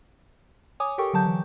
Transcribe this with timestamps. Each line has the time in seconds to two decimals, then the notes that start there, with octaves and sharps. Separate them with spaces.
0.80 C#5 G#5 D6 D#6
0.98 G4 A4 A#4 G5 C#6
1.13 D3 F#3 A5 G6
1.25 E3